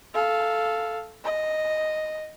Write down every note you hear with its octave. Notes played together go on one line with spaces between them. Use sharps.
A4 F5
D#5